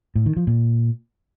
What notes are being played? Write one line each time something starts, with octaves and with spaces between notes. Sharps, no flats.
A2
D#3
F3
A#2